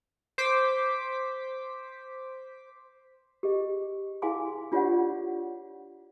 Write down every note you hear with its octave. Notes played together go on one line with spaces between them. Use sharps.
C5 D6 B6
G4 G#4 D#5
E4 G#4 F5 G#5 C6 D6
D4 F4 G4 C#5 D5 F#5